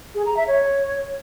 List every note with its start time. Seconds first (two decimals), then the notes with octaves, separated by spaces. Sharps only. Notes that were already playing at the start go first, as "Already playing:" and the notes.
0.15 G#4
0.26 A#5
0.37 E5
0.48 C#5